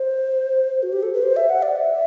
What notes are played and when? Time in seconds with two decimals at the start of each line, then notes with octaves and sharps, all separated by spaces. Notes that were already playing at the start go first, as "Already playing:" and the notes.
Already playing: C5
0.83 F#4
0.93 G4
1.03 A4
1.14 B4
1.23 C5
1.36 E5
1.49 F#5
1.62 D5
1.76 E5